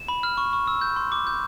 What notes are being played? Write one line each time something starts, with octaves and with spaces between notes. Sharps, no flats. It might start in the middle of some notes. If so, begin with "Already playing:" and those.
Already playing: E7
B5
F6
C#6
C#6
E6
G6
C6
D6
G6